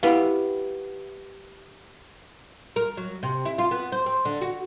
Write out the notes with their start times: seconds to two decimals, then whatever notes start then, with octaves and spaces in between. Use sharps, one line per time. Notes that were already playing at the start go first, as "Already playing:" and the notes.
0.03 B3 E4 G4 F5
2.76 A#4
2.97 F#3
3.23 C3
3.45 E4
3.58 F4
3.71 B3
3.92 C5
4.06 C4
4.25 D3
4.41 F#4